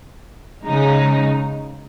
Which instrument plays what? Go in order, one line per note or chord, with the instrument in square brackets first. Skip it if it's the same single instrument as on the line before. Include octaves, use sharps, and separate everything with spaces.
[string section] C#3 G#3 D#4